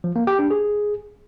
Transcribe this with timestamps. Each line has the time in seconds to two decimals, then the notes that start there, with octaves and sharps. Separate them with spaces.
0.04 F3
0.16 A#3
0.27 G4
0.39 D4
0.51 G#4